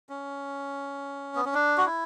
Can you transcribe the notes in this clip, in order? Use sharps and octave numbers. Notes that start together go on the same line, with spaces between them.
C#4
B3
C#4
D4
F#4
E4